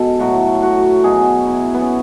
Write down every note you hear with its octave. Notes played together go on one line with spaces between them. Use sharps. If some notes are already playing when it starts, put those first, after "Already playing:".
Already playing: B2 G#3 A4
A2 F#3 F#4
F#4
B2 F#3 G#4
E4
B3
C#4